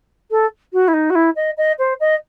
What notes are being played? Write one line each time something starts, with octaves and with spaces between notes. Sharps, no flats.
A4
F#4
E4
D#4
F#4
E4
D#5
D#5
C5
D#5